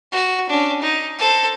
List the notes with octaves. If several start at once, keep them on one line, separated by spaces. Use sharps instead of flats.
F#4
C#4 D4
D#4
A4 C5